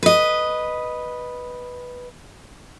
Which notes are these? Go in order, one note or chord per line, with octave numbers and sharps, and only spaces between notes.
B4 D#5